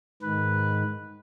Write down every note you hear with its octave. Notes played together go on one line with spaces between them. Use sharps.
G#2 D#3 B4